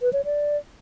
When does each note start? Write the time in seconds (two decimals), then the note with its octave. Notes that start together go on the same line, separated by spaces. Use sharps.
0.01 B4
0.13 C#5
0.25 D5